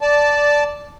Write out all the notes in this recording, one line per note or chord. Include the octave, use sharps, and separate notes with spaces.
D5 A5